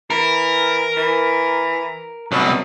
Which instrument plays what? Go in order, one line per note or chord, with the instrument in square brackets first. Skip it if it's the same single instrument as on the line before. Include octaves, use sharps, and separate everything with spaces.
[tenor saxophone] E3 [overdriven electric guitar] A#4
[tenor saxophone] E3
[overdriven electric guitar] C2 F#3 [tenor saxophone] B2